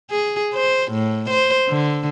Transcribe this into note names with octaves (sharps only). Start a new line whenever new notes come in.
G#4
C5
A2
C5
D3